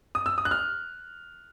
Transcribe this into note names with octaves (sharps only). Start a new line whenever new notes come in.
D#6
E6
D#6
F#6
F6